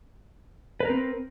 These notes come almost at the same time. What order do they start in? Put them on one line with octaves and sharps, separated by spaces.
B4 A#4 C4